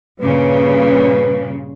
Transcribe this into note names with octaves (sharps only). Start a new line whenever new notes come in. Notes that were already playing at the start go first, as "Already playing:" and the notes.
G2 A#2 C#3 B4